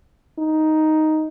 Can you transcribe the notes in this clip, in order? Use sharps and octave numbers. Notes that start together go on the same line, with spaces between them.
D#4